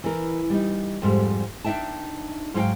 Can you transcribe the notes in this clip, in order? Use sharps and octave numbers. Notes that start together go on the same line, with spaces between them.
E3 A#4
G3 D#4
F2 G#2 G3
D4 D#4 E5 G5 A5
G#2 F#3 F4 F#4 F5 G5